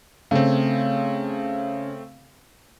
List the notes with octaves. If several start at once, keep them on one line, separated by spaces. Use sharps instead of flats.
C#3 A3 C4